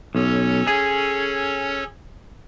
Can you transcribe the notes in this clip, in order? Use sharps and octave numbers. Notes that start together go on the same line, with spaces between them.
B1 C#4 A4 C#5
G#4